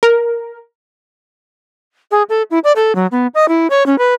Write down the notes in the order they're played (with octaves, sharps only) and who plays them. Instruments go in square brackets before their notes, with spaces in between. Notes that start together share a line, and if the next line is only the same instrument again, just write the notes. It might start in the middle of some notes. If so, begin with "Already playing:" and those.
[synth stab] A#4
[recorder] G#4
A4
E4
D5
A4
F#3
B3
D#5
E4
C#5
C#4
B4